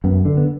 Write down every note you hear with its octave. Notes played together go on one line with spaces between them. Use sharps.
F#2 B3
D3
B3